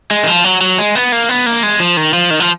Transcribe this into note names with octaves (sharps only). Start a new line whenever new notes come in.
G#3
D#3
F3
F#3
F#3
G#3
B3
A#3
B3
A#3
G#3
F3
D#3
F3
D#3
F3